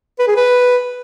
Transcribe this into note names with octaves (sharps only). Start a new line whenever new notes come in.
B4
G#4
B4